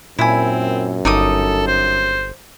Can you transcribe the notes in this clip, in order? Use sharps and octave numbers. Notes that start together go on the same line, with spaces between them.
F#2 A#2 C4 E4 G#5
G1 D#4 A4 D6 D#6
C5